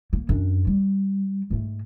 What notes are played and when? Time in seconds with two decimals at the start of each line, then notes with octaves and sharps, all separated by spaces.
0.13 A#3
0.29 F#2 D4
0.67 G3
1.50 G#2 A3